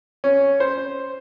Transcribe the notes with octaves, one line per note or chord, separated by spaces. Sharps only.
C#4
C5